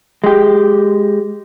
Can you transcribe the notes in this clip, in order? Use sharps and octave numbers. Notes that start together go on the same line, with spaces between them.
G#3 G4